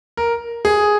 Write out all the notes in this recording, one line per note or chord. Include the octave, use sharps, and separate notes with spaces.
A#4
G#4